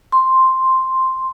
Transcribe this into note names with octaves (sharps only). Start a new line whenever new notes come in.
C6